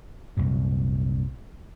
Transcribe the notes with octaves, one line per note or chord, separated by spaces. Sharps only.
C2 F#2 A#2